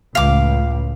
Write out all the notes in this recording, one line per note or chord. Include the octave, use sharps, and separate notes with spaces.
C#2 A2 F5 D6